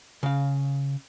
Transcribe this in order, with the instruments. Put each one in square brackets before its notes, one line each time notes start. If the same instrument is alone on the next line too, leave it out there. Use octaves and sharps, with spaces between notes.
[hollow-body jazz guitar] C#3 F5